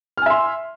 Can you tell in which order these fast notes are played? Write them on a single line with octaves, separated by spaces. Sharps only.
F6 G#5 E5 C6